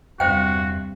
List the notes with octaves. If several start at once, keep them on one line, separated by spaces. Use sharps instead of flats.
E2 G2 C3 F#4 C5 F5 G5